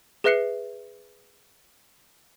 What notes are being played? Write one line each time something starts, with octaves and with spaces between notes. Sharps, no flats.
G#4 B4 E5 F#6 C7 C#7